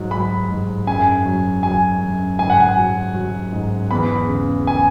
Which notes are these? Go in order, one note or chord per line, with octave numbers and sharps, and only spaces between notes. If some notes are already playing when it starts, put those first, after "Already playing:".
Already playing: G#2 F#3
F#3 B5
G#2
F#2 G#5
F#3
F#3 G#5
F#2
G#2 G#5
F#5
G#5
F#3
F#3
G#2
E2 B5
C#3
G#5